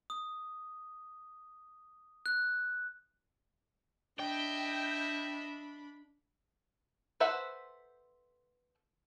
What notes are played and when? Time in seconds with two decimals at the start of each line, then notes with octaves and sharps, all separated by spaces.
0.10 D#6
2.26 F#6
4.20 D4 D#5 E5 G5 B5
7.20 A4 B4 C5 E5 F#5